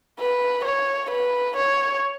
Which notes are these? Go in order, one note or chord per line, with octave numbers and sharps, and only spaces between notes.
B4
C#5
B4
C#5